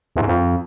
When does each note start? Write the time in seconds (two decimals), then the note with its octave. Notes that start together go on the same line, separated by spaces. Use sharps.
0.16 E2
0.21 G#2
0.27 F2